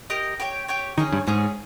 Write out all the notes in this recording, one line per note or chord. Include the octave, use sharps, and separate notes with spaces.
G4 A#4 D#5
G4 C#5 G5
G4 C#5 G5
D#3 C#4 G#4 C#5
G2
G#2 C#4 G#4 C#5